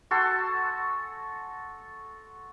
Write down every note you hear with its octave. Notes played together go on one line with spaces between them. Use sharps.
F#4 A4 G#5 C6